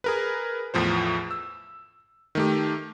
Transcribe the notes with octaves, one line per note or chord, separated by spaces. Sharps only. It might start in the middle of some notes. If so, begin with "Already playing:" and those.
G#4 A#4 B4
E2 A2 F3 C5
E6
D#3 A3 G4